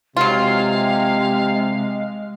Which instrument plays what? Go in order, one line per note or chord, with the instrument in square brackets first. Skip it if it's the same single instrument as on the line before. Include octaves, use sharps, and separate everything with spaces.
[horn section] C3 [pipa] F#3 F4 [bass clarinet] G#3 [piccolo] F5